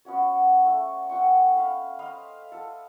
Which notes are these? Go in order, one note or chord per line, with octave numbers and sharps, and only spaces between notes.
B3 C#4 F#4 C#5
A3
F#5 G5 C#6
B4 F5
C5 D#5 F5 B5
A4